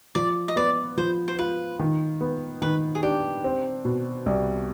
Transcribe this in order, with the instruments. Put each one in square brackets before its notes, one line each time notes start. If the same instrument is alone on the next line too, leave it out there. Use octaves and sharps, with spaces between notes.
[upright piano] F3 [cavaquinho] D5
[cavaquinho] D#5
[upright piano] B3 [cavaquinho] D5
[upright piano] F3 [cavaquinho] C5
[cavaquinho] C5
[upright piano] F4 [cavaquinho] B4
[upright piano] D#3
B3
[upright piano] D#3 [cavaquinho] B4
[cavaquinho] G#4
[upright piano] D4 [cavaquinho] G4
[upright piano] C4
B2
C2